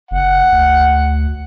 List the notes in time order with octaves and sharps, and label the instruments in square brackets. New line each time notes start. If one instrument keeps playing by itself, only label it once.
[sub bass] F#1 [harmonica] F#5
[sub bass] D2